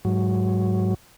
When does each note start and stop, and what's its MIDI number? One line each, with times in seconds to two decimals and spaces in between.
0.05 0.94 44
0.05 0.94 54